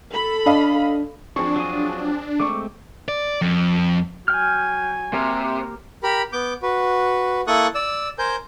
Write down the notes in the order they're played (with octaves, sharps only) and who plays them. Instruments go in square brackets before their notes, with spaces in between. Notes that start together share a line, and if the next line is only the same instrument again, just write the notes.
[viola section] A4 B5
[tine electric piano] D4 [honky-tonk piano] D#5 F5
[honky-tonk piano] F3 C4 G#4 [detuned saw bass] D4 [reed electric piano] C#6
[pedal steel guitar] F#3 F4 D#6
[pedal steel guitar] G#3 A3 C4 [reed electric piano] C#6 D6
[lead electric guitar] D5
F2
[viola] F#3 G#5 [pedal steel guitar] G5 F6
[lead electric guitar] C3 [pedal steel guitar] A#3 G4 A#4
[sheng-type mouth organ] G4 A#4 B5
B3 D6 G6
F#4 B4
A#3 E4 A4 C#6 D#6 F#6
D5 E6
A#4 C5 G#5 G6